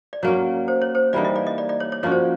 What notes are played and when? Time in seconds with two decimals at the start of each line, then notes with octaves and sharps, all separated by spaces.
0.13 D5
0.23 F#3 A#3 C#4 C#5
0.68 C5
0.82 C#5
0.95 C5
1.13 E3 G3 A#3 D#4 D5
1.25 D#5
1.36 D5
1.47 D#5
1.58 D5
1.69 D5
1.80 C#5
1.92 C#5
2.03 F3 A#3 C#4 F#4 C#5
2.12 C5